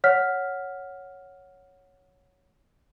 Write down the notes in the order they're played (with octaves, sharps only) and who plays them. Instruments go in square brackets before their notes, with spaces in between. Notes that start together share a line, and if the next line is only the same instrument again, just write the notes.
[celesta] C#5 F#5 F6 B6